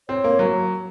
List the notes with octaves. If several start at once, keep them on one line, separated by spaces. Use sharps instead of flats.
C4 C#5
A#3
F#3